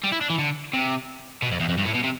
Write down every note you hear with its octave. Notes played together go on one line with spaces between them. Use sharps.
G3
E4
D4
E3
D3
C3
B2
F2
E2
F2
G2
A2
B2
C3